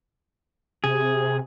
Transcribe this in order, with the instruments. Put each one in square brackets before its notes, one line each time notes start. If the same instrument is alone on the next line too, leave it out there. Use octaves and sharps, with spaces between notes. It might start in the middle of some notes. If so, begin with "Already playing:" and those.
[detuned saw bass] C3 [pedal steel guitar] G#4